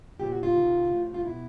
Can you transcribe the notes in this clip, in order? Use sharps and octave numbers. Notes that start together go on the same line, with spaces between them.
A#2 F3 G4
F#4
F4
C3 D#3
A2 F3
F4
B2 E4